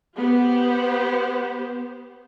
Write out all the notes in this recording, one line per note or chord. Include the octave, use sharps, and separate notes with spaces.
B3 G4 C5